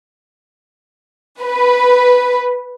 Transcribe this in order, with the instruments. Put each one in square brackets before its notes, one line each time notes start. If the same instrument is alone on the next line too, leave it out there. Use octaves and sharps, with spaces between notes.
[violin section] B4